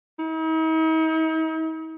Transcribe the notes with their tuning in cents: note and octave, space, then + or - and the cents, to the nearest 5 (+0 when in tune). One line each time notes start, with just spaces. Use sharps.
D#4 +45